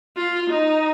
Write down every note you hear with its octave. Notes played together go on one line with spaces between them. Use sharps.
F4
D#4